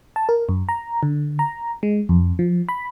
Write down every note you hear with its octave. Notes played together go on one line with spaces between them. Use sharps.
A5
A#4
F#2
A#5
D3
A#5
G#3
F2
F3
B5